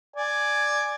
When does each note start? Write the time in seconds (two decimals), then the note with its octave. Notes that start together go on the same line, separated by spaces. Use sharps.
0.16 D5 G#5